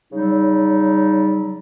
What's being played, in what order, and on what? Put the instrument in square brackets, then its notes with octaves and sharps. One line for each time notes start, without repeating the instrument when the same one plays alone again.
[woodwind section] C#3 F#3 G3 D#4